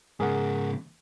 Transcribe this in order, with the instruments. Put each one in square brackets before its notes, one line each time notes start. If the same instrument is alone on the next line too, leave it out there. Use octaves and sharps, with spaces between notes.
[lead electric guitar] G#2 C#3 [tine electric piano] G#4 A#4 F#5